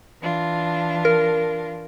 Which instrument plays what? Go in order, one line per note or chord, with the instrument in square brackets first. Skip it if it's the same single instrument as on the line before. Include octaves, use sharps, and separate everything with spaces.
[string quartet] E3 D4 F4
[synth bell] A#4